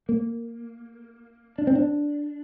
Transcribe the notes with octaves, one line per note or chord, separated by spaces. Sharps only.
A#3
D4
C4
D4